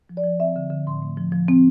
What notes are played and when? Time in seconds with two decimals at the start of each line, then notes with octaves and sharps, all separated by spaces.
0.09 F3
0.17 D5
0.24 F3
0.40 C4 E5
0.56 D3
0.70 D3
0.87 A2 C6
1.02 A3
1.17 F3
1.32 F3
1.48 C4